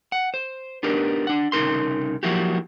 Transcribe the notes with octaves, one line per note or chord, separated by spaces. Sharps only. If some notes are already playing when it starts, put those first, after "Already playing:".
F#5
C5
B3 D4 D#4 G4 A#4
D4 F#5
C2 C#3 D#4 A#4 C6
F3 F#3 A#3 E4 F#4 G4